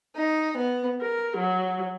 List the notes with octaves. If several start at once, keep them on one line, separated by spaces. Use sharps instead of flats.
D#4
B3
A#4
F#3